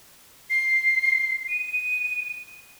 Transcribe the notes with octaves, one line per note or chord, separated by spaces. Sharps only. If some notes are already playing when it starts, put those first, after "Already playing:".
C7
D#7